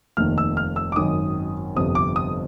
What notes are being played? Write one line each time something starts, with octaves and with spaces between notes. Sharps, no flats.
F1 D#2 D#3 F6
E6
F6
E6
D6
G#1 F#2 D#3 D#6
G1 F2 C3 D#6
D6
D#6